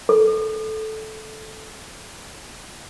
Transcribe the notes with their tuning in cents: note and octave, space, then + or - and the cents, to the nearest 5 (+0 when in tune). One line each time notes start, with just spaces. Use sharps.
A4 -15